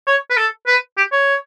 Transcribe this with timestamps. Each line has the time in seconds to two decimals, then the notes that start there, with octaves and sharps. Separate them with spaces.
0.07 C#5
0.30 B4
0.37 A4
0.67 B4
0.97 G4
1.12 C#5